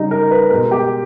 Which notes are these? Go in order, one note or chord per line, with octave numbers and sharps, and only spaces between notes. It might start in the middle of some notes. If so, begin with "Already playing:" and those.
Already playing: C#3 G3 D#4
A#4
B4
B2 G#3 A#4
G4